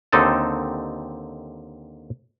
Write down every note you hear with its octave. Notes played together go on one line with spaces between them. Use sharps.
D#2 D3 C4 D#4 A4 A5